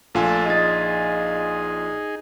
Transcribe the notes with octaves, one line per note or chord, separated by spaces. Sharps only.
A#1 A3 D4 F4 A4 G#5
D#4 G#4 D#5 A6